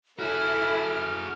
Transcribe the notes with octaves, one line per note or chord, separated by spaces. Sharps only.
E4 F#4 G#4 A4 F6